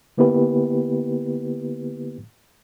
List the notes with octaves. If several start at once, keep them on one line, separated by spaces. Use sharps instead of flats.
D3 A#3 B3 E4 G4 B4